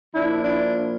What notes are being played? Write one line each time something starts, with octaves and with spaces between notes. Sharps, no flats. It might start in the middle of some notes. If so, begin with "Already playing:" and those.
A#2 F3 D4 E4
D4 E4